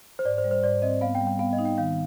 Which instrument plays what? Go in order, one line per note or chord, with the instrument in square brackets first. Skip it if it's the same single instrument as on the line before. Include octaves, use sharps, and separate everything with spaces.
[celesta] C5
[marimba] G#2 [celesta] D5
[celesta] C5
[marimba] G3
[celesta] C5
[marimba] G#2 [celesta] D5
[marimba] C4 [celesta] D#5
[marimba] B3 [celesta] F5
[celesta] G5
[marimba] G3
[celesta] G5
[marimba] B3 [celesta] F5
[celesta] D#5
[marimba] D#4
[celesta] G5
[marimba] D#3 [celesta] F5